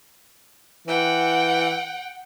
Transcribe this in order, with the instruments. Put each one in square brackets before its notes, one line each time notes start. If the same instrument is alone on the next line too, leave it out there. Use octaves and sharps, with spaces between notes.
[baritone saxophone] E3 [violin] F#5 G5